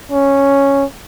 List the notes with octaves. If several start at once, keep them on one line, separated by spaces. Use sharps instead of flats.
C#4